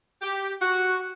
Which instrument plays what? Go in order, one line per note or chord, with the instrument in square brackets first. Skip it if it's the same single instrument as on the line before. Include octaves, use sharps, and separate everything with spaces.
[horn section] G4
F#4